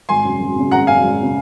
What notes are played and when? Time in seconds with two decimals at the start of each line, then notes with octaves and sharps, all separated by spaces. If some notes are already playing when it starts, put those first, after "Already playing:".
0.09 G#1 G#5 C6
0.25 F#2 C#3
0.40 G#1
0.56 F#2 C#3
0.71 G#1 F#5 A#5
0.87 F#2 C#3 F5 G#5
1.03 G#1
1.23 C#3